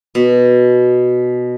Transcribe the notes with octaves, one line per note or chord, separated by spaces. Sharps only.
B2